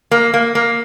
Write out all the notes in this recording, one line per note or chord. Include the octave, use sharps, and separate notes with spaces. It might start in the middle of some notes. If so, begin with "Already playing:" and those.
A#3
A#3
A#3